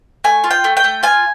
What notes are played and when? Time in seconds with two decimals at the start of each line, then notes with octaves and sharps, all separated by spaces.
0.24 A3 G#5
0.44 F4
0.51 G5
0.64 A3
0.77 G5
0.84 A3
1.03 F4 G#5